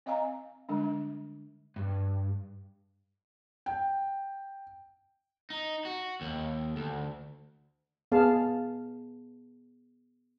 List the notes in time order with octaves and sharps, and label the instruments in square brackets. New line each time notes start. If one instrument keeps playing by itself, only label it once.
[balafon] C4 D#5 F5 G#5 A#5
D3 G3 G#3 D4
[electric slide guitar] G2
[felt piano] G5
[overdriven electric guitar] D#4
F#4
D#2
D2
[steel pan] B3 G#4 F5 A5